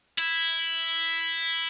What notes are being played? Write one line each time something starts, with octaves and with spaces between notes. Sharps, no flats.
E4